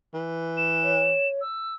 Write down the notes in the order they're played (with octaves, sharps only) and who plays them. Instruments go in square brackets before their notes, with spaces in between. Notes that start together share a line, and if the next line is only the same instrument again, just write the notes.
[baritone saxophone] E3
[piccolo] E7
[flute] C#5
[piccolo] E6